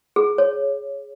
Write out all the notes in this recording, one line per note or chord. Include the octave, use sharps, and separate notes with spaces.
G#4
C#5